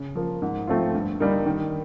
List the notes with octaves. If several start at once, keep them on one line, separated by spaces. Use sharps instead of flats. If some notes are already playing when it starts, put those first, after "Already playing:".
Already playing: C#3
F3 A#3
G#2
F3 A3 C4 F4
G2
D3 G3 A#3 D#4
D#3